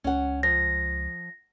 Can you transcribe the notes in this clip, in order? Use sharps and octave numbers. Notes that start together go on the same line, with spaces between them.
C#2 C#4 F#5
F3 A#6